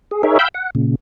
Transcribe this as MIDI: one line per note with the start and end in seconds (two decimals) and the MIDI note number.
0.11 0.23 68
0.23 0.38 63
0.23 0.38 68
0.23 0.38 70
0.23 0.38 73
0.23 0.38 76
0.39 0.48 77
0.39 0.48 79
0.39 0.48 83
0.39 0.48 88
0.39 0.48 91
0.54 0.70 78
0.75 0.95 46
0.75 0.95 49